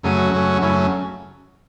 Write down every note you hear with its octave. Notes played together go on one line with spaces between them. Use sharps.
F#2 C#3 F#3 A3 C#4 G#4
F#4
F#2 C#3 F#3 A3 C#4
F#2 C#3 F#3 A3 C#4 E4